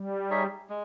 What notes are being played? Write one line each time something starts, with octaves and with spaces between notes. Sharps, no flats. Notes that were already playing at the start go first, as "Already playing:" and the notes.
Already playing: G3
D#4 G#4 C#5 E5
G#3